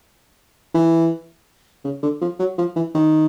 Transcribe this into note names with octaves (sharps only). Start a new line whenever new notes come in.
E3
C#3
D3
F3
F#3
F3
E3
D#3